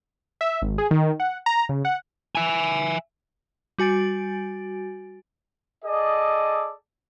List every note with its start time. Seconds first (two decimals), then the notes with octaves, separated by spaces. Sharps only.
0.41 E5
0.62 G#1
0.78 G#4
0.91 D#3
1.20 F#5
1.46 A#5
1.69 C#3
1.85 F#5
2.35 E5 G#5
3.78 G3 F#4 G#5 A6 D7
5.85 G#4 A4 D5 D#5